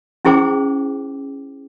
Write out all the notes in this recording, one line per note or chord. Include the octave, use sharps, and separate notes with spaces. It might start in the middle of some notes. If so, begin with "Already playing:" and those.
C#4 E4 G#4 C5 G5 D6